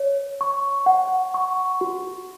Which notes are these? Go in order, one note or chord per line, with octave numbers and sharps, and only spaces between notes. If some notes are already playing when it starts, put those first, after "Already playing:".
Already playing: C#5
C#6
F#5
C#6
F#4